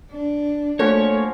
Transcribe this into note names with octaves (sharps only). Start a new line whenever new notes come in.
D4
F3 A3 A#3 C#4 F#4 A4 C#5